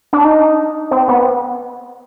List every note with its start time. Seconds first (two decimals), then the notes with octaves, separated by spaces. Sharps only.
0.13 D4
0.25 D#4
0.91 C4
1.08 B3